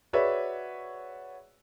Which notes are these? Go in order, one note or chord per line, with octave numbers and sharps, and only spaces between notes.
F#4 G#4 B4 C#5 D5 E5